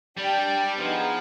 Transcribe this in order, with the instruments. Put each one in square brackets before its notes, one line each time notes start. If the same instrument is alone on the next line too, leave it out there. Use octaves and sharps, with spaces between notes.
[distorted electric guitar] G3 [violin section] D4 G4 D5 G5
[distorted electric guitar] F3 [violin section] B3 D#4 G#4